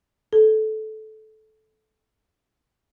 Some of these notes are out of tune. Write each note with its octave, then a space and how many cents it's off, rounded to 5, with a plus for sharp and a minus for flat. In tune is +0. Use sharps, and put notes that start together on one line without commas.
A4 -15